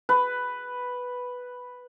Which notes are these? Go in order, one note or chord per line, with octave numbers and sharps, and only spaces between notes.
B4